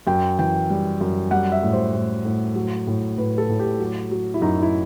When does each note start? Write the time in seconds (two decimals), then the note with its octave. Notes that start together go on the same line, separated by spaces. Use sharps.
0.07 F#2 G5
0.39 E3 G5
0.70 G3
1.01 F#2
1.31 G3 F#5
1.52 E5
1.63 A2
1.73 C5
1.94 A2
2.25 A2
2.55 F#3
2.87 A2
3.17 A2 B4
3.38 A4
3.49 A2
3.59 G4
3.80 F#3
4.11 F#3
4.34 E4
4.42 F#2 D#4
4.62 E4